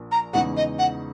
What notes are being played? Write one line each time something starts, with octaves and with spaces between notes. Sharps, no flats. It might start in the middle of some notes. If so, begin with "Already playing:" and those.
Already playing: A#1 A#2
A#5
E2 C#3 G#3 D#4 F#5
D#5
F#5